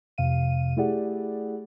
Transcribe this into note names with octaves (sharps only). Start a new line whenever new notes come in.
F2 C3 F5 D#7
A3 E4 G4 G#4 D5 F#5